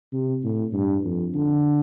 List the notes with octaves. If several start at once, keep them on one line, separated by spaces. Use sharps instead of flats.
C3
A2
G2
F2
D3